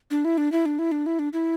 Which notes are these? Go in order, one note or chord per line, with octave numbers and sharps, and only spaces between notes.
D4
E4
D4
E4
D4
E4
D4
E4
D4
E4